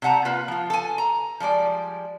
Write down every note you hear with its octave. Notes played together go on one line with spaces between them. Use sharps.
C3 G3 F#5 A5 A#5
A#3 F4 B4
F3 F4
A4 G#5
A#5
F3 G3 G#3 D5